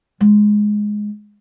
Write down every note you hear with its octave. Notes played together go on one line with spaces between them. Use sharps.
G#3